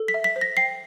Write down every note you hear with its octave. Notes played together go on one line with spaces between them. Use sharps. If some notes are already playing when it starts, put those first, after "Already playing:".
Already playing: A4
B6
E5
B6
C5
A#6
G5 C7